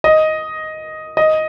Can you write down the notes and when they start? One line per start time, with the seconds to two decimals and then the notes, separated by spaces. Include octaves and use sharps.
0.04 D#5
1.17 D#5